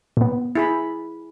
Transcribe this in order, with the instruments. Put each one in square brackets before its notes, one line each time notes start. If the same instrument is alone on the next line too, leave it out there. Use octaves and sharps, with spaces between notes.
[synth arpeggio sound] A#2 B3
[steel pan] E4 G#4 B5